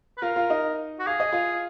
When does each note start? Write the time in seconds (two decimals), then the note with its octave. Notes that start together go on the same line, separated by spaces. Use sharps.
0.18 B4
0.22 F4 A#4 F5
0.36 F4 F5
0.50 D#4 D#5
0.99 F#4
1.07 G#4 F5
1.20 D#5
1.33 F4 F5